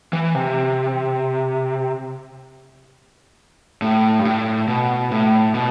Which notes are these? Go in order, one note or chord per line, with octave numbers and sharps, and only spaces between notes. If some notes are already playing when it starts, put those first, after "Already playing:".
E3
C3
A2
G2
A2
B2
A2
B2